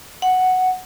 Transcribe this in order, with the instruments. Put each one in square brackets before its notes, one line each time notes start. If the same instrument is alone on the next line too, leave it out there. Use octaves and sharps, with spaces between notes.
[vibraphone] F#5